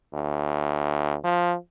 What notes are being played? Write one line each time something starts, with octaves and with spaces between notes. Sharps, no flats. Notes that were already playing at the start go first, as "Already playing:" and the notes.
D2
F3